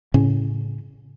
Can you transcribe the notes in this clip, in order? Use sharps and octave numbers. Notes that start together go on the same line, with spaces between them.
A2 C#3 C#4